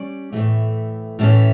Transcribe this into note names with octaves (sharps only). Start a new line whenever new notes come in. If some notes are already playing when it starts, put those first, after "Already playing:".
Already playing: G3 C#4 D5
A2 E3 A3
A2 E3 A3 C#4